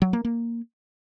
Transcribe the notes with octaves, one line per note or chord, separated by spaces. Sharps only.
F#3
A#3
A#3